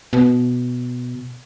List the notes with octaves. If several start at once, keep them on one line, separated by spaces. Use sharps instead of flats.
B2